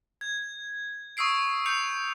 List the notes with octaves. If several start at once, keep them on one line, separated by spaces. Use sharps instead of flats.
G#6
C#6 D#6 E6 C7 D7
C#6 G6 C#7 F7